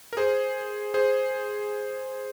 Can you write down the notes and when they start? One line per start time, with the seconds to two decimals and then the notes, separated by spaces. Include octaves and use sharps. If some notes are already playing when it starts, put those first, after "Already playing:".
0.13 A#4
0.17 G#4 C5
0.94 G#4 C5